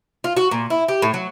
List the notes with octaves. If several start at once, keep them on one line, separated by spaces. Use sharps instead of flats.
F4
F#4
A#2
E4
G4
A2
F#3